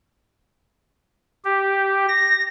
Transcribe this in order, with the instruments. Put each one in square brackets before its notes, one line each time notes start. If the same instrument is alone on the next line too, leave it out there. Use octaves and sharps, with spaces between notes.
[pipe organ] G4
A#6